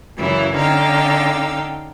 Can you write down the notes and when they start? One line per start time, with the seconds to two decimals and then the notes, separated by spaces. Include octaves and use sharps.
0.17 F#2 C#3 E3 E4
0.55 D3 C#4 D#4 F5 G5 E6